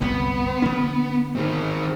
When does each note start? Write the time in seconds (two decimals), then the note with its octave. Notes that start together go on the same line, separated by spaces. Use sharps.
0.01 G1 C2 F#2 B3
0.62 D3 A#3 C#4
1.35 D#3 C4